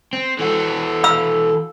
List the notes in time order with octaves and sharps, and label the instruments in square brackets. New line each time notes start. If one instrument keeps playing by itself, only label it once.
[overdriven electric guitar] C4
[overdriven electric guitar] E3 F#4 [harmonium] A4
[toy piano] F5 B5 E6